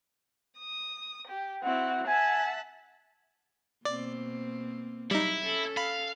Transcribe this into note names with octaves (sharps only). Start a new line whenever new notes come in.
D#6
G4
C4 E4 F#4 F#5
E5 F#5 G#5 A5
B2 A#3 C4 D5
F#3 G3 D#4 E4
C#4 A4
F5 B5